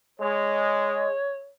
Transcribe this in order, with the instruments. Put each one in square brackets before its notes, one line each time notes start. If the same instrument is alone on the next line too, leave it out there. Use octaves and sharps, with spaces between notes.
[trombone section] G#3 [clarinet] C#5